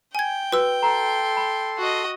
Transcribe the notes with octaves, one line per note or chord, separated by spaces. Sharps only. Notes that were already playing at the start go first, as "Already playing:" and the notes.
G5 G#5 G#6
F#4 B4 E6
A4 A#5 C6
B5
F#4 D#5